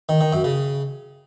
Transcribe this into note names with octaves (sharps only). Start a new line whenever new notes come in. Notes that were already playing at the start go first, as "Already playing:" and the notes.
D#3
D#3
F#2
C#3